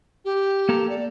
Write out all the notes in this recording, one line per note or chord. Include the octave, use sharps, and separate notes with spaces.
G4
A#3 A4 A#5
D5